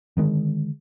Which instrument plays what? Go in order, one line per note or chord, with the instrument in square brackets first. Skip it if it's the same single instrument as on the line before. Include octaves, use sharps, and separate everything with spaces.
[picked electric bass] D3 D#3 G#3